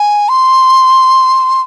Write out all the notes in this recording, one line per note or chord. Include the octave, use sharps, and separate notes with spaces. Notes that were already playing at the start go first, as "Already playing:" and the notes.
Already playing: G#5
C6